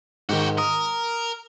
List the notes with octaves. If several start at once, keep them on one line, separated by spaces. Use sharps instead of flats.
G#2 D#3 F#4 G4
A#4 D#6